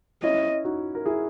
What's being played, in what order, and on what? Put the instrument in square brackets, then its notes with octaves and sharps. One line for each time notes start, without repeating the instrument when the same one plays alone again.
[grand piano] C#4 E4 [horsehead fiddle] D#5
[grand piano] D#4 F#4
A#4
E4 G#4